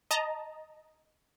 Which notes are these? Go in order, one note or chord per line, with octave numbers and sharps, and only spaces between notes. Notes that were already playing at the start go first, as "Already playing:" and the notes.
D#5 A5 A#5